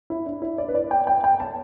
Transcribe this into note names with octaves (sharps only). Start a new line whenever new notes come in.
E4
D4
E4
D5
B4
D5
G5
G5
G5
A5